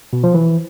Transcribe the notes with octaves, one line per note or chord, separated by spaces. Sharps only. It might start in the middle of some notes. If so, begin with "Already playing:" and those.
B2
F3
E3